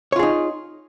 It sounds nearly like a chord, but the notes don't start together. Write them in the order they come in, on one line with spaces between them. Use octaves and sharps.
C#5 F4 G#4 D#4